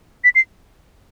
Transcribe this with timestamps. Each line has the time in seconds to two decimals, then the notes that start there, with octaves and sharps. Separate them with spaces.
0.24 B6
0.35 C7